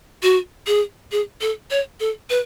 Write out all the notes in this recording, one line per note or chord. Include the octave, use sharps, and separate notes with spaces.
F#4
G#4
G#4
A4
C#5
A4
B4